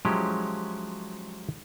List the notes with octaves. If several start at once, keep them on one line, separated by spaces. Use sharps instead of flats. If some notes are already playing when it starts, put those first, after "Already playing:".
F3 F#3 G#3 C#4 E4 G4